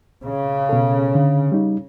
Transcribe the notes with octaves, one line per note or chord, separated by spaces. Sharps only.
C#3
B2 A4
D3
G3 D#4